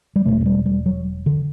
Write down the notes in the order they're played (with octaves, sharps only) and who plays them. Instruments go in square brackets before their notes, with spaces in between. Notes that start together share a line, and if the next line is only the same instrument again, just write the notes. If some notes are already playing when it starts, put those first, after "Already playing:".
[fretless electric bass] G3
E1 E2 B2 A3
A3
G3
G3
F#3
D3